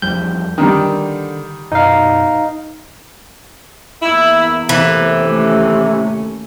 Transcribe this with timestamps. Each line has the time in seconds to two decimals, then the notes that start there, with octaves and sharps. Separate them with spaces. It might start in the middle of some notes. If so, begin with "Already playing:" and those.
0.02 E2 F3 G3 G6
0.58 D3 D#3 G3
1.72 F#2 B2 D#4 F5
4.02 E2 A#3 E4
4.69 A2 C3 E3
5.23 D#2 A3 C#4